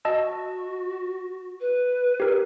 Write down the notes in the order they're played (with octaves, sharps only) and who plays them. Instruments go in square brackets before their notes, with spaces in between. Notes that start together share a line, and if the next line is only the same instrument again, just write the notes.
[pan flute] F#4 [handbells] D#5 A5 E6
[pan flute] B4
[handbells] G4 A#4